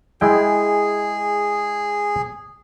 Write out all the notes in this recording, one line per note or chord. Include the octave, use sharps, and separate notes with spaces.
G#3 E4 G#4 G5